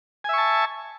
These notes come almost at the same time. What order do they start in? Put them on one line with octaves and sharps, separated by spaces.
G#5 E5 C#6 A5